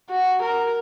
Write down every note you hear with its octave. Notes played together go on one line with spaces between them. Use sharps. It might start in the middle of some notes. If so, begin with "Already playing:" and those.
F#4
A#4